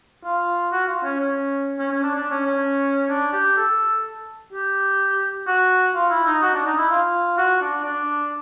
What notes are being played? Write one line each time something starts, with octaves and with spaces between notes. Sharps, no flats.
F4
F#4
F4
C#4
C#4
C#4
C#4
D4
D4
C#4
C#4
D4
G4
A4
G4
F#4
F4
E4
D#4
F#4
D4
D#4
E4
F4
F#4
D4
D4